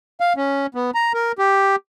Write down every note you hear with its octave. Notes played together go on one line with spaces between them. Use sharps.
F5
C#4
B3
A#5
A#4
G4